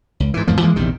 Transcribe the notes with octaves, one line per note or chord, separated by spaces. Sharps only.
C#2
G#2 E3
E2 G#2 F3 A#3
E3 F3 G#3 A#3
A#1 E2 C3 D#3